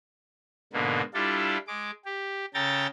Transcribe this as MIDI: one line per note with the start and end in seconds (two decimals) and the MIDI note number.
0.73 1.02 44
0.73 1.02 47
0.73 1.02 50
0.73 1.02 58
1.14 1.58 55
1.14 1.58 62
1.14 1.58 64
1.14 1.58 65
1.14 1.58 69
1.67 1.91 56
1.67 1.91 86
2.05 2.45 67
2.54 2.87 49
2.54 2.87 69
2.54 2.87 79
2.54 2.87 82
2.54 2.87 93